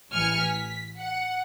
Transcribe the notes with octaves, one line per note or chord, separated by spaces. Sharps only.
A1 E3 G#5 F6 C#7
B6
F#5